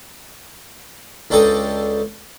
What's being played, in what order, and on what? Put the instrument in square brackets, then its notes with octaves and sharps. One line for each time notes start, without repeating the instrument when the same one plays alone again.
[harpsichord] C#2 D4 A4 G5 A#5 D#6